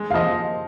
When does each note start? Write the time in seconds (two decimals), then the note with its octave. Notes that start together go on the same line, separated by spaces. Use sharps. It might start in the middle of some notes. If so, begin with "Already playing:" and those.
Already playing: G#3
0.10 F5
0.14 F3 D#5